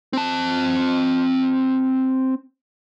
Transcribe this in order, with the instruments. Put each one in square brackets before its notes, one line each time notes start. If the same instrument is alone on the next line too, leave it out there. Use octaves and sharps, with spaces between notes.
[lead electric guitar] C4 A5